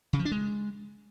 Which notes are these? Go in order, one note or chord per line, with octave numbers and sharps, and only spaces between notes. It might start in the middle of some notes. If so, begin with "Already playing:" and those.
C#3
F3
D4
G#3